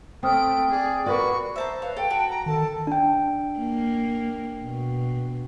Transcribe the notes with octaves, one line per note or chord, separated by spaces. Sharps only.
A3 C4 G5 D#6 F6 D7
G#4 D5
F#4 A#4 B4 D5 C#6
C5 E5 A5 A#5
B4 C#5 F5
A4 G5
F#4 A5
A#5
D#3 A4 A5
D4 G5
A#3
B2